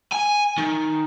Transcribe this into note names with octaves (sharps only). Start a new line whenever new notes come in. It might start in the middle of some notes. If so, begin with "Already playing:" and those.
G#5
D#3